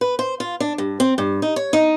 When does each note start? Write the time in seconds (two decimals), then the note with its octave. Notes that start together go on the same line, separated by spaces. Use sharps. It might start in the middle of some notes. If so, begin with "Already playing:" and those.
0.01 B4
0.19 C5
0.40 F4
0.60 D4
0.78 G2
1.00 C4
1.18 G2
1.42 D#4
1.56 C#5
1.73 D#4